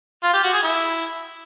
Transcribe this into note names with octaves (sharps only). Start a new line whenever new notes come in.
F4
G4
F#4
G#4
E4